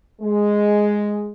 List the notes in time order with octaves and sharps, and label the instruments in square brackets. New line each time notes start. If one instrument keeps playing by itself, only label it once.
[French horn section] G#3